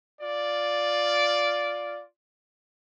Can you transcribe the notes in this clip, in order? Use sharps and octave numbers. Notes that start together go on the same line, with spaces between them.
F4 D5